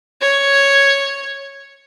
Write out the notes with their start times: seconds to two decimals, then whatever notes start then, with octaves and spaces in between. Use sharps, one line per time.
0.22 C#5